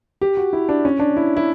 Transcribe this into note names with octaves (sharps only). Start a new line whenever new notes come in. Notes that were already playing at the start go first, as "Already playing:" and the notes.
G4
F#4
E4
D4
C#4
D4
E4
E4